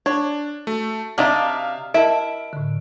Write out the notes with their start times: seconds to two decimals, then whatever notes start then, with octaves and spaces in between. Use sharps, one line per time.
0.06 D4 C#5
0.67 A3 F#4
1.18 C3 D4 D#4 D5 E5 F5 F6
1.94 E4 A#4 D#5 E5 A5 D7
2.53 A2 D3